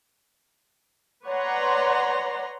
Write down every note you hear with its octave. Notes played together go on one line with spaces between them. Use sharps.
B4 C#5 D5 F#5 A#5 C6